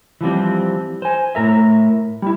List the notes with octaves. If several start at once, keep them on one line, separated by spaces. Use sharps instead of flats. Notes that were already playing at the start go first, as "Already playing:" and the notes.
E3 F3 G3 C4
C5 G#5
A2 A#4 E5
G3 E4